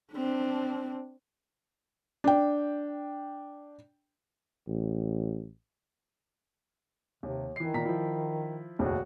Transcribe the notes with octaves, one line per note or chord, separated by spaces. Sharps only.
C4 D4
D4 G5
A1
D#2 C3
D#3 E3 C7
A#2 A#5 B6
F3 E4
F1 A#1 D#2 F#4